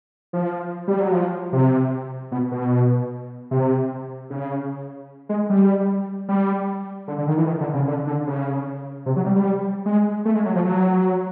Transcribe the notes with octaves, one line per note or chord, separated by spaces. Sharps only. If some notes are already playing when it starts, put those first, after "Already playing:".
F3
G3
F#3
F3
C3
B2
B2
C3
C#3
G#3
G3
G3
D3
D3
D#3
E3
D#3
D3
C#3
D3
D3
C#3
C3
F#3
G3
G3
G#3
A3
G#3
F#3
F3
F#3